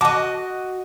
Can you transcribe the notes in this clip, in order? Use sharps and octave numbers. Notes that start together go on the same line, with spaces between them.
F#4 D#5 A5 D6